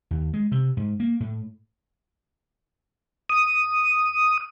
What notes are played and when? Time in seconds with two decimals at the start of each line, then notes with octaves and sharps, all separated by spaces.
0.11 D#2
0.34 G#3
0.52 C3
0.77 G#2
1.00 A#3
1.20 A2
3.29 D#6